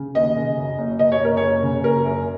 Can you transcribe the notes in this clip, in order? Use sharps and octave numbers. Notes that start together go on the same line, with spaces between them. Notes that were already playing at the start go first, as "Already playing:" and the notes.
Already playing: C#3
D#2 D#5
C#3
F#2
F#1
F#1 D#5
C#5
F#1 A#4
F#1 C#5
C#3
F#1 A#4
F#2